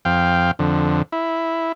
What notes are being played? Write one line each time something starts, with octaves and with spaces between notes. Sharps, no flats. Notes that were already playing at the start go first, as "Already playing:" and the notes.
F2 F5 G5
F2 D3
E4